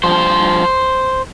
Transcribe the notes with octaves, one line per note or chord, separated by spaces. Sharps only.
G2 F3 C5